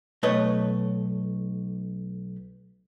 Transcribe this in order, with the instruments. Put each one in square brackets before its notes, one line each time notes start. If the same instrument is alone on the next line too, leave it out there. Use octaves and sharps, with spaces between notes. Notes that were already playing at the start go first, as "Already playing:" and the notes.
[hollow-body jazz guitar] B1 A3 B4 C#5 D#5